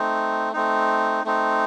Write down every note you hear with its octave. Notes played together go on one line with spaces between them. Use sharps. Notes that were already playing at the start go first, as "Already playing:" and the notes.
Already playing: A3 C4 D#4
A3 C4 D#4
A3 C4 D#4